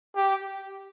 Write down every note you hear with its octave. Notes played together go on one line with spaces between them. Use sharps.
G4